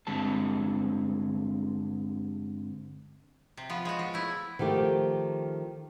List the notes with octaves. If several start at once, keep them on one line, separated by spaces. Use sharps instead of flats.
G2 D3 G#3 C4 A5
C3
F3 B3
G#3 F#4
F3
A3 E4
D#3 F3 A3 G4